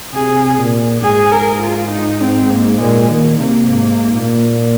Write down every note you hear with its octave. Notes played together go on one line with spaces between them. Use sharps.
C3 G#4
A#2
G#2 G#4
A#4
F4
D#4
C4
A#3
A#2 G#3
D#3 A#3
C3 A#3
G#2
A#2